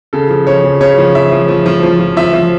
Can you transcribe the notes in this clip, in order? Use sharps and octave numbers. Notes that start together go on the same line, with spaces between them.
C#3 A4
F3
F3 C#5
C#3
C#3 C#5
F3
F3 E5
F3
F3
F3
F3
F3
F3 E5
F3